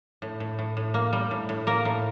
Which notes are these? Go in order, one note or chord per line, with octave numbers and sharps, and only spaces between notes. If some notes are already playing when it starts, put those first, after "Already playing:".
A2
A2
A2
A2
A#3
G3
A2
A2
A#3 A#4
A2